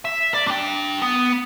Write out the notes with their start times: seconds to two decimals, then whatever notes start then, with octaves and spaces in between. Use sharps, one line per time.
0.05 E5
0.34 D5
0.47 D4 G5
1.02 B3